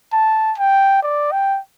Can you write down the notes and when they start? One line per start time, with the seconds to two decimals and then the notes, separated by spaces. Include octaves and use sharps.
0.13 A5
0.58 G5
1.03 D5
1.32 G5